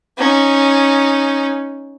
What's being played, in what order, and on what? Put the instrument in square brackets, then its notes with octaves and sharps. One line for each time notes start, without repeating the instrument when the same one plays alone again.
[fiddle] C#4 D#4